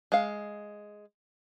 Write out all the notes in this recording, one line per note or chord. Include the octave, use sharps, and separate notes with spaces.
G#3 F5